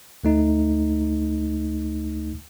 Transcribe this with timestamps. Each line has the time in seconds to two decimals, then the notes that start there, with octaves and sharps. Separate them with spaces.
0.24 D2 A3 D#4